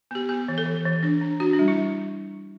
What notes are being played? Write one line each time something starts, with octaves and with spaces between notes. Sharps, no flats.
B3 G4
B3 G4
E3
A4
E3
E3
D4
D4
D4 F#4
D4
G3
E4
G3